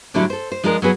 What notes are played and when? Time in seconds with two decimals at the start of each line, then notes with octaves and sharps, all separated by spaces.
0.14 A2 D3 F#3 G3 D4 E4
0.30 A4 C5
0.52 C5
0.64 F3 G#3 D4 G#4 A#4
0.82 F#3 B3 G#4 B4